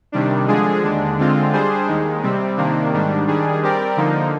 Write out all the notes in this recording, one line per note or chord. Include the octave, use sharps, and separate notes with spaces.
C3 D#3 G3 D4
D3 F3 G#3 D4 G#4
D#2 D3 G#3 D4
D3 G#3 C4 F4
G3 D4 G#4 C5
D#2 D#3 G#3
C3 G3 C4
C3 D#3 A#3 D4
G#2 D#3 G3 D4
D#3 G3 D4 G#4
G3 C4 G4 A#4 D5
D3 F3 A#3 D#4